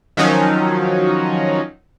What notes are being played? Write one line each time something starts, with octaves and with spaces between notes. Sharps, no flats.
D#3 F3 F#3 C#4 D#4